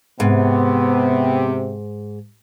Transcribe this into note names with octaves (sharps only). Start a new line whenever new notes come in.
G#2 C3 B3